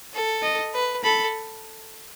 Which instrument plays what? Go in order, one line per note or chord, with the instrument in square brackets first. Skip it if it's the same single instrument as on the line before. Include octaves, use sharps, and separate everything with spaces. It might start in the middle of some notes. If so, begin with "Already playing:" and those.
[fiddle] A4
[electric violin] D#5
[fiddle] B4
[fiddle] A4 [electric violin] B5